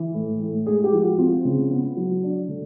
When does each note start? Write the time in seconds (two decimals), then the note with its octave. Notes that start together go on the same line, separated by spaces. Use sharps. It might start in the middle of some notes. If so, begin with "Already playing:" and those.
Already playing: E3
0.14 A2
0.40 A2
0.66 G#3 G#4
0.84 G4
0.93 F3
1.01 F#4
1.18 C4 F4
1.45 C#3
1.70 B3
1.97 F#3
2.23 D4
2.48 D3